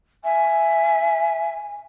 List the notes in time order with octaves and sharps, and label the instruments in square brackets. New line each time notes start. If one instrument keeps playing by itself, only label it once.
[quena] E5 [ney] G#5